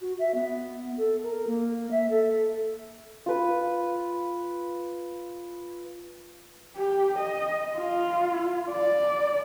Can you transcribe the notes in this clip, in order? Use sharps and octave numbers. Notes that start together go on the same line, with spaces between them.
F#4
E5
B3
A4
A#4
A#3
E5
A4
F4 B4
G4
D#5
F4
D5